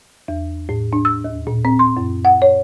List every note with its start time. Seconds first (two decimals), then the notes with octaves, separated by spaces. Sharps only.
0.28 E2
0.69 A2
0.93 D4
1.05 E6
1.24 D#2
1.47 A#2
1.65 C4
1.79 C6
1.97 F#2
2.25 F#5
2.42 C#5